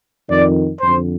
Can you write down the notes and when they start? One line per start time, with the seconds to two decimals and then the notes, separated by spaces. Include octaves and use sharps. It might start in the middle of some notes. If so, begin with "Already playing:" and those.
0.29 F2 D#3 D5
0.81 F2 D3 C5